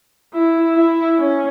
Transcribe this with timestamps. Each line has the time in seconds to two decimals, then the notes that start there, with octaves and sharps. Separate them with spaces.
0.33 E4
0.75 E4
1.18 C#4